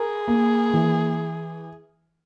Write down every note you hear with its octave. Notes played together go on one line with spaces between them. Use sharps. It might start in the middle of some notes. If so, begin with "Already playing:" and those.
Already playing: G#4 A#4
A#3
E3